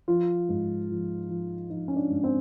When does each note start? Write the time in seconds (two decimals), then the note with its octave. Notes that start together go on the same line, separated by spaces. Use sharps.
0.08 F3 F4
0.49 G#2
0.90 F3
1.29 F3
1.70 F3 D#4
1.88 C#4
1.96 D4
2.10 G#2
2.24 C4